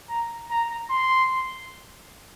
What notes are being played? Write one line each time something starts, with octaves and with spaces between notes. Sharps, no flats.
A#5
A#5
C6